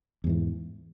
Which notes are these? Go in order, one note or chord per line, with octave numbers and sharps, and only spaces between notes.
E2 G#2 E3